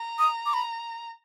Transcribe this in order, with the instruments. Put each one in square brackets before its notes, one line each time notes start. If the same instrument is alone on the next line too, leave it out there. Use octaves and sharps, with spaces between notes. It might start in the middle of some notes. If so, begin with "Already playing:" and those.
Already playing: [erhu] A#5
[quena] D#6
D6
B5